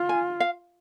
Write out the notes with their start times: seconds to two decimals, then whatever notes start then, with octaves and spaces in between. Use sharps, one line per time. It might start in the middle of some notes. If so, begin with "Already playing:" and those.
Already playing: F4
0.09 G#5
0.40 F5